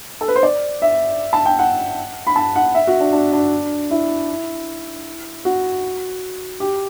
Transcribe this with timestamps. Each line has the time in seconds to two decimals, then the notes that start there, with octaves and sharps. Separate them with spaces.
0.21 A4
0.28 B4
0.36 C5
0.43 D5
0.82 E5
1.33 A5
1.46 G5
1.59 F#5
2.27 B5
2.36 A5
2.56 F#5
2.75 E5
2.87 F#4
3.00 D4
3.12 D4
3.33 D4
3.91 E4
5.45 F#4
6.60 G4